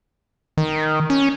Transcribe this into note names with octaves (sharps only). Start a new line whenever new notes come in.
D#3
C#4